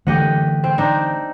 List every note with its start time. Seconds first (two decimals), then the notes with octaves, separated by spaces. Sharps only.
0.07 D3 E3 A3 G4 D#5 F#5
0.64 C4
0.78 C4 D4 D#4